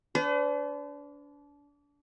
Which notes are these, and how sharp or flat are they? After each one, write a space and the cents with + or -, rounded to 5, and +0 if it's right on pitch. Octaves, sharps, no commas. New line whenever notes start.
D4 -30 B4 +45